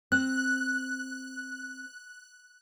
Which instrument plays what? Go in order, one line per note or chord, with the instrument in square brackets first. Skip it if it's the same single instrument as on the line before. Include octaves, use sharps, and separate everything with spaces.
[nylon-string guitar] C4 [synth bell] F#6